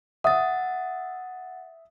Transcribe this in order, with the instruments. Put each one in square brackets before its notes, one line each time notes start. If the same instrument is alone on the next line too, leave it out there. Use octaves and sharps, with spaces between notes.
[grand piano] E5 D#6 [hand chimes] F#5 A6